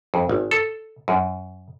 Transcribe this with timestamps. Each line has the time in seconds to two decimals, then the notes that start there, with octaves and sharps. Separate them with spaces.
0.14 F2
0.29 G#1
0.51 A4
1.08 F#2